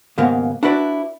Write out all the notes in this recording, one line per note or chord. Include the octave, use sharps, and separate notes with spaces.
D#2 G#2 C#3 A#3 B3
D4 E4 F#4 B4 D5